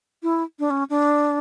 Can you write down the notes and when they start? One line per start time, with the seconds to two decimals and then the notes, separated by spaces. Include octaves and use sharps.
0.23 E4
0.59 D4
0.70 C#4
0.90 D4